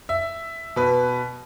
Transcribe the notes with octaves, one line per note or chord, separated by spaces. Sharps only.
E5
B2 B4